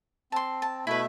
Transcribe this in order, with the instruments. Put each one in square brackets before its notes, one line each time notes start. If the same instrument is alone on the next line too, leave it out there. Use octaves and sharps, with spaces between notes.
[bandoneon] C4 [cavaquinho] A5 C6
[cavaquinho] A5
[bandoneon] B2 A3 E5 [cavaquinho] E4 B4